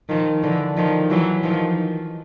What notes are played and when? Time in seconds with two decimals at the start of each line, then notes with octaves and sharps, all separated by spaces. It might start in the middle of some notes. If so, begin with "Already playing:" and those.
0.09 D#3 F3
0.43 D3 E3
0.77 D#3 F3
1.10 E3 F#3
1.44 D#3 F3